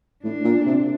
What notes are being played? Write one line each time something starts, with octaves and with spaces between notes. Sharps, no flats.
A2 D4
A#2
C3